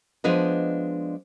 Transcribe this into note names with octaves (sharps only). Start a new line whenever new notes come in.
F3 G#3 B3 D4 B4 D#5